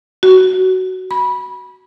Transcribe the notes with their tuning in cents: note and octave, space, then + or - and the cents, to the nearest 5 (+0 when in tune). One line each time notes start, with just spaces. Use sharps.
F#4 +10
B5 -15